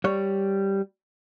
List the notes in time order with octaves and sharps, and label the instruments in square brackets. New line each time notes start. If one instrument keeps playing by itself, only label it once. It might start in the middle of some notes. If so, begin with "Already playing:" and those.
[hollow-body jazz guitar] G3 C#5